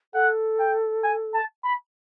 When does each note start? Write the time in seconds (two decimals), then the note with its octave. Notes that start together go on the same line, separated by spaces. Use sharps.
0.14 A4 F#5
0.59 G5
1.04 G#5
1.34 A5
1.64 B5